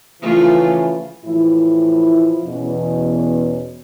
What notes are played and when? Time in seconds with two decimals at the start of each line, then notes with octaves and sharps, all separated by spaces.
0.22 C#3 E3 F3 A3 F4
1.24 A2 E3 F3 E4
2.45 E2 B2 C#4